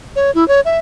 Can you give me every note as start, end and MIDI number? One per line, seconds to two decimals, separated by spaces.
0.16 0.31 73
0.35 0.47 64
0.48 0.61 73
0.65 0.79 76